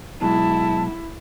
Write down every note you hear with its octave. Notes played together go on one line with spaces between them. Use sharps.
B2 F#3 G#3 E4 A5